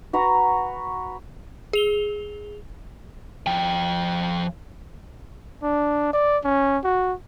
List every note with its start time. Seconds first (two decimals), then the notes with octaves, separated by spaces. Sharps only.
0.13 F#4 B4 A#5 C#6
1.73 G#4 F7 G7
3.47 F3 G5
5.63 D4
6.13 D5
6.44 C#4
6.84 F#4